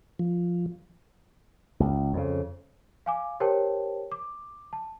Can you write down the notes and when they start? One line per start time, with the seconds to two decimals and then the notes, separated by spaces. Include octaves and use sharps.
0.19 F3
1.80 C#2
2.13 F2 C#3
3.06 F5 G#5 D6
3.40 G4 A#4 C5 C#5 G5 A5
4.12 D6
4.73 A5